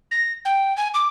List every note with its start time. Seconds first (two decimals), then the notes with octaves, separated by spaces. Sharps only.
0.11 A#6
0.45 G5
0.77 G#5
0.94 D6